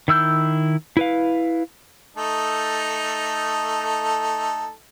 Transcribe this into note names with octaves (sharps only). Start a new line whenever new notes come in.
D#3 E4 E6 G6
E4 B4 F5
A3 D#4 A4